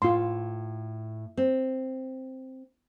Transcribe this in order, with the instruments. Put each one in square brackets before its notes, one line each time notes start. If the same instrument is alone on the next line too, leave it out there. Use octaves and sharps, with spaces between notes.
[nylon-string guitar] A2 [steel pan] F4 C6
[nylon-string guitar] C4